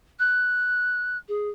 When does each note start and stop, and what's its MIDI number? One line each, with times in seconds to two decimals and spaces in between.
0.19 1.17 90
1.28 1.49 68